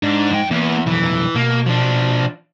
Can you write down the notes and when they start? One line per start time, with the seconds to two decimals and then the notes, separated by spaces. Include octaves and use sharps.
0.03 G#2 D4
0.30 F2 G5
0.51 E2 A#3 B3
0.86 B1 F2 E3
1.35 B2 A#3
1.66 F3 D4